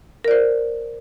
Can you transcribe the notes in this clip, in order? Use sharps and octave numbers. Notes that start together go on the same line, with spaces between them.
A#4 C5 D5